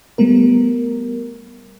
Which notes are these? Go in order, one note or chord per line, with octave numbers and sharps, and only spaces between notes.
G3 A3 B3 A#4